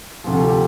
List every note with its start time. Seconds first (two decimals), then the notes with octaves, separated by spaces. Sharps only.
0.24 D2 C3 F3 F4
0.35 A4
0.44 G4